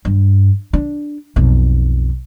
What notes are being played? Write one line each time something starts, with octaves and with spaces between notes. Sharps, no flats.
G2
D4
B1 F2